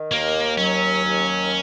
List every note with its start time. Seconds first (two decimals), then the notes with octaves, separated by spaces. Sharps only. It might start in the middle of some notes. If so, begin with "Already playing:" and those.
Already playing: D#3
0.12 D#2 A#3
0.58 F#3 C#4
1.04 D#2